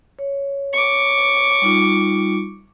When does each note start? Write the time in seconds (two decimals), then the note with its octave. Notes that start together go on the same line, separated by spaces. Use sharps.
0.19 C#5
0.73 C#6 D6
1.62 G3 D#4 F4